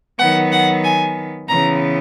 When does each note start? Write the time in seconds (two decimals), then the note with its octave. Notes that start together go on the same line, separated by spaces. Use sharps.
0.19 D#3 F#3 B3 F#5
0.52 F#5
0.84 G#5
1.49 C#3 E3 B3 A#5